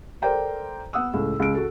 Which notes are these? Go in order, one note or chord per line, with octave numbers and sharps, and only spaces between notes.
A4 A#4 C5 D5 G5 A#5
B3 F#5 D#6 E6
C#2 A2
C#2 D7
F#4 A4